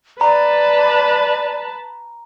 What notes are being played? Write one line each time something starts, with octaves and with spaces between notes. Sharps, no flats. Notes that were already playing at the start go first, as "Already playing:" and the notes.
B4 D5 A5 A#5